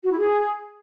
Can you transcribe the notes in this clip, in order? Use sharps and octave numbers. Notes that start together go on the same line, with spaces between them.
F#4
E4
G#4